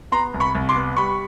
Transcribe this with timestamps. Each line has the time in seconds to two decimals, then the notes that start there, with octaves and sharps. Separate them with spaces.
0.12 B3 A#5 C6
0.34 C2
0.40 B5 C#6
0.55 C2
0.69 C6 D6
0.75 B3
0.97 G3 B5 C#6